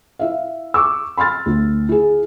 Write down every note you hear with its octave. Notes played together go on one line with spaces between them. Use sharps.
E4 E5 F5
C#6 D6 E6
B5 C6 F6 A6
D2
E4 G#4